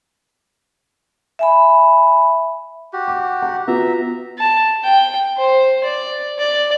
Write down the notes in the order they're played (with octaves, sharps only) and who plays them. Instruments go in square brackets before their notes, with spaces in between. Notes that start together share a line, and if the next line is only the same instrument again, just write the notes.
[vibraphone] E5 G#5 B5
[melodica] F#4 G4
[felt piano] D6
F#5
[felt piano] B3 F4 F#4 [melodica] E5 A#5
[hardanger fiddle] A5
G5
C5
D5
D5